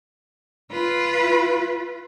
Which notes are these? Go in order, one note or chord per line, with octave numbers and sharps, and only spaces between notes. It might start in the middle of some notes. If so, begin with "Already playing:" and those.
F4 B4